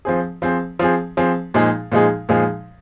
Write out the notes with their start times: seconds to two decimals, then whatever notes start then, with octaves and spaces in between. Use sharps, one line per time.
0.05 F3 C4 G#4
0.42 F3 C4 G#4
0.79 F3 C4 G#4
1.17 F3 C4 G#4
1.54 A#2 F3 G#3 D#4 G#4
1.92 A#2 F3 G#3 D#4 G#4
2.29 A#2 F3 G#3 D#4 G#4